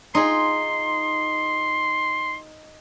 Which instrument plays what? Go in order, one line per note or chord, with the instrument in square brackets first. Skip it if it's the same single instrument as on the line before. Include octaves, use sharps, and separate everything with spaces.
[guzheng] D#4 F4 G#4 [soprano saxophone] C6